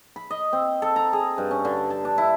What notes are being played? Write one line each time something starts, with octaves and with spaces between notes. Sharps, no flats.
B5
D#5
C4
A4
A#5
G#4
G2
C#4
D3
A5
D4
E4